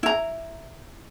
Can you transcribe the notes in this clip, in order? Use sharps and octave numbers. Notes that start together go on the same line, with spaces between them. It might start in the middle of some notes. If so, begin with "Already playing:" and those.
E4 A#5